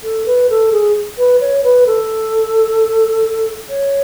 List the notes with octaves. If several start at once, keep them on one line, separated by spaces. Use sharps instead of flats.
A4
B4
A4
G#4
B4
C#5
B4
A4
C#5